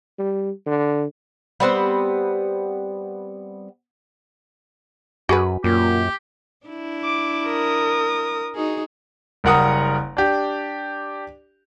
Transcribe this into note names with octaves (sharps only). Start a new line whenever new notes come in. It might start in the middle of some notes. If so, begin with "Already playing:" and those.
G3
D3
G3 B3 C4 F#5
F#2 F#4 G#4 B4
F#2 A#2 G4
D4 E4
D6
A#4 D#6
D#4 F#4 G#4
F#1 G3 A#4 F#5 A#5 D#6
D4 G4